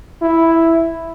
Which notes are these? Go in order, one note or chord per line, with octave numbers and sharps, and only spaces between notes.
E4